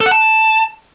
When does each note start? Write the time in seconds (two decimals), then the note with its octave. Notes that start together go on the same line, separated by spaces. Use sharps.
0.01 A4
0.06 F#5
0.11 A5